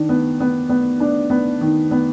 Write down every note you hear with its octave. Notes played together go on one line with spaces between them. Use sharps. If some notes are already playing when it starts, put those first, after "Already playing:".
Already playing: D#3 D4
B3
B3
B3
D4
B3
D#3
B3